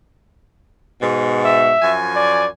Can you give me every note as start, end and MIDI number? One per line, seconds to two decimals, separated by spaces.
1.01 1.72 44
1.01 1.72 47
1.45 1.96 76
1.82 2.45 42
1.82 2.45 53
1.82 2.45 80
2.16 2.47 74